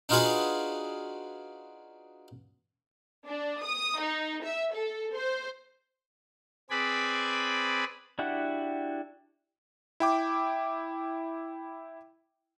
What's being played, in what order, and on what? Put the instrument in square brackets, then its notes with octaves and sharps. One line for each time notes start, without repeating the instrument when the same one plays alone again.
[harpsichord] D4 D#4 F4 F#4 G#4 B4
[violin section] D4
D#6
D#4
E5
A4
C5
[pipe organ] C4 G#4 B4 D5 G#5 B5
[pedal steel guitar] D4 E4 F#4 G4 F#5
[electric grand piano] E4 G5 D6